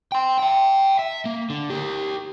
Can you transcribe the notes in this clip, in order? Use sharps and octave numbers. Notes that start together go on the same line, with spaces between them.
G5 C6
E5 G5
E5
A#3
D3
G4 A#4